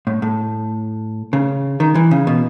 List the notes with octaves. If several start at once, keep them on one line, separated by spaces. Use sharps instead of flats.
A2
A2
C#3
D#3
E3
C#3
B2